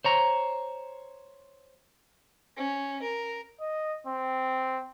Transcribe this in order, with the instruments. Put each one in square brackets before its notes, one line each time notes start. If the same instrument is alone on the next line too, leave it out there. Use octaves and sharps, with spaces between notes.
[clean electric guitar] C5 C#5 A#5
[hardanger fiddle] C#4
A#4
[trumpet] D#5
C4